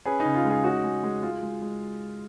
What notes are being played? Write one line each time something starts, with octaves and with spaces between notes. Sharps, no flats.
C#4 G#4 B4
D#4
C#3
F4
G#3
F4 G#4
C#4 D#4 F#4
G#3
G#3
G#3 F4
G#3
G#3